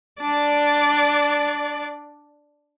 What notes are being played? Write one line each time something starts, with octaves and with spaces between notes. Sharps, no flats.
D4 D5